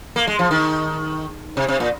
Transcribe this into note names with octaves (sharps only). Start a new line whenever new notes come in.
A#3
G#3
F3
D#3
C3
C3
A#2